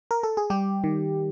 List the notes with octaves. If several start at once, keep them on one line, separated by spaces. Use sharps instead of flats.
A#4
A4
G#4
G3 G4
D#3